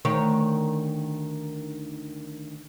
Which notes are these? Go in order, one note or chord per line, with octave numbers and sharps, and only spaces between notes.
D2 D#3 C#5